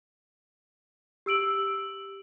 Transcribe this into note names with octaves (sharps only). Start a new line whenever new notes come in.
G4 E6 D7 F#7